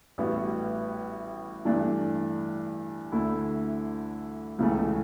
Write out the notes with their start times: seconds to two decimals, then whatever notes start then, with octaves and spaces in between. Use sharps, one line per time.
0.18 A1 A2 G3 B3 F#4
1.65 G2 E3 A3 D4
3.12 D2 D3 A3 E4
4.59 C#2 C#3 E3 A3